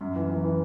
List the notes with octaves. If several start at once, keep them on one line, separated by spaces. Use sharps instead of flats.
F#2
E3
E3
E3